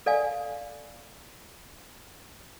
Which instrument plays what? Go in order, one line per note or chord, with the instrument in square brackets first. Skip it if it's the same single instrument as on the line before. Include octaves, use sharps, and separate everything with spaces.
[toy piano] A4 D5 F5 G#5